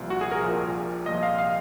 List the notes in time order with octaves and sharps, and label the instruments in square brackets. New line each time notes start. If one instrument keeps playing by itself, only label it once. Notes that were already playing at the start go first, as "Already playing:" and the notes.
Already playing: [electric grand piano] C2 A#2 F3
F#4
G#4
A#4
A#1 A#2 F3
C2 A#2 F3 D#5
F5
F5